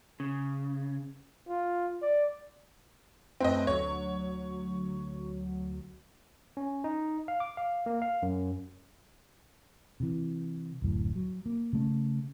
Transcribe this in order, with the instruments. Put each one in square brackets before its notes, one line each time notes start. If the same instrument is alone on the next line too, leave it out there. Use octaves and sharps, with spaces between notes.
[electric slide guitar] C#3
[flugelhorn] F4
D5
[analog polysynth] F#2 A3 B4 [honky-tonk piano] C4 D#5
[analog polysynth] D2 F#3 [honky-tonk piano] C#5
[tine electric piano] C#4
D#4
F5
D6
F5
A#3
F5
F#2
[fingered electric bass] C3 E3
D1 F#2 A2
F#3
A#3
C#3 A3 C#4